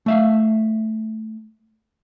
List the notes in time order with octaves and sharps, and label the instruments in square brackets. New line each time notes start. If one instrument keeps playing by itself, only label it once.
[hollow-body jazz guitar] A3 E5 F5